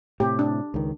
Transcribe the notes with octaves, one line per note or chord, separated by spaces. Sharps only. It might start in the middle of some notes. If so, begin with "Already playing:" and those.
A2 C3 G4
D4
C#2 D#3